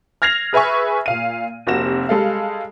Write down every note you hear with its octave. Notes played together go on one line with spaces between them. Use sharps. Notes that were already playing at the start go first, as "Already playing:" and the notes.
F6 G#6 A#6 C7 F7
G#4 B4 E5 G#5 C#6
A#2 F5 D#7
F1 C3 A#3 F#4 A#6 E7
G3 G#3 A4 F5